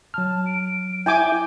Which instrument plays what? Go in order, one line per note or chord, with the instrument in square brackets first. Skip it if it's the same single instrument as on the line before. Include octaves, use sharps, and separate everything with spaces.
[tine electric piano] F#3 F6 [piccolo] A5
[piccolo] D7
[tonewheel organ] E4 [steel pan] G5 G#5 D6 [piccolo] G6